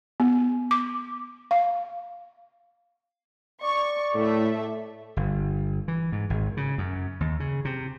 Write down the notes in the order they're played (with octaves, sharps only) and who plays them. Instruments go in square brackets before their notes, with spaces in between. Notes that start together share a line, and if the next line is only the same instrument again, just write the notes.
[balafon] B3
D6
F5
[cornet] D5 [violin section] C#6
[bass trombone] A2 [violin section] A3 E5
[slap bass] G1
E3
G#2
G#1
C#3
F#2
D#2
C#3
C3